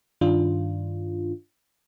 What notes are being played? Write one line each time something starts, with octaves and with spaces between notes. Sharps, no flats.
G2 D#3 D4 F4